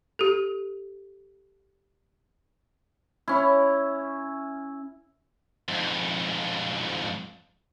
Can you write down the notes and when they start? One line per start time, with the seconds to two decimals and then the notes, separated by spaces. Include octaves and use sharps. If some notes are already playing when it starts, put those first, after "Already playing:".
0.19 G4 A4
3.28 C#4 E4
5.68 F2 G#2